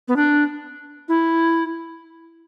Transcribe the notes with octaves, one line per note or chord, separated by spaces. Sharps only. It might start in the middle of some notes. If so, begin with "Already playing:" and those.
B3
D4
E4